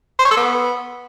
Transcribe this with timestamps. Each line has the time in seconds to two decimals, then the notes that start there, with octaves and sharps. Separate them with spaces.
0.19 C5
0.25 C#5
0.31 A4
0.37 B3